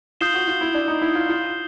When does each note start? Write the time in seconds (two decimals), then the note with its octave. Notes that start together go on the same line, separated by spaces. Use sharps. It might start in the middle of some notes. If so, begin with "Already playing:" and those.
0.21 F4 D#6 G6 C7 E7 G7
0.34 F#4
0.48 F4
0.61 E4
0.74 D4
0.88 D#4
1.02 E4
1.15 F4
1.29 F4